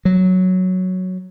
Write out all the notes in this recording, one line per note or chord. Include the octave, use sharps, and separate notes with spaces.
F#3